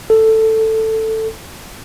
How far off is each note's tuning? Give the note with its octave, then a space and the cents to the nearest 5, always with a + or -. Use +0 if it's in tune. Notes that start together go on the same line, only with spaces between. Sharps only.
A4 +5